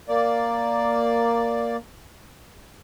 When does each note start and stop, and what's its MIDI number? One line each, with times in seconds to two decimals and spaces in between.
0.09 1.77 58
0.09 1.77 74